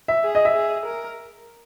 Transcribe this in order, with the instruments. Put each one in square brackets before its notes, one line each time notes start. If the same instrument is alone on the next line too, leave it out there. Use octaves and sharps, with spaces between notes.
[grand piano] E5
[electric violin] G#4
[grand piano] D#5
E5
[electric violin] G#4
A#4